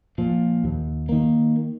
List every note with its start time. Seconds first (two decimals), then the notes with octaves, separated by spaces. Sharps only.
0.18 A#2 F3
0.64 D#2
1.09 D#3 A#3